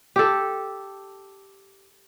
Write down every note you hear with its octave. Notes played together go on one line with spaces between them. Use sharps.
G4 A4